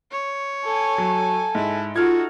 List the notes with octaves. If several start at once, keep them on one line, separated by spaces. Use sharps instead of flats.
C#5
A4 G#5
F#3
G#2 E4
D#4 F4 F#4 A4 F6 G#6